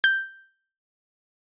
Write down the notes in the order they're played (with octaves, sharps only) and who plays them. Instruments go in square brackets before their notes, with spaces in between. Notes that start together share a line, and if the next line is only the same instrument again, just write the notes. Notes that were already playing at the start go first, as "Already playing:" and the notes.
[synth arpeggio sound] G6